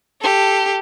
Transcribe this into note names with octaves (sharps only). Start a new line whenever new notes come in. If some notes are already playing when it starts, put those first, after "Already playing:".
G4 A4